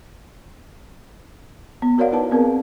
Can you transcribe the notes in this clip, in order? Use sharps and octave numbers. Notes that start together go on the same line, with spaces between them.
B3
F#4 A#4 C#5 D5 F5 F#5
D#4 E4 B4 D5 A5
B3 C4 G#4 A#4